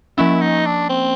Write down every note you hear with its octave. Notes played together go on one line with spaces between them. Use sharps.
F3 A#3 C#4 E4
D#4
D4
C4